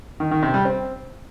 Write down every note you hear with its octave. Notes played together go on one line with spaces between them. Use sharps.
D#3
D#3
C3
G3
C4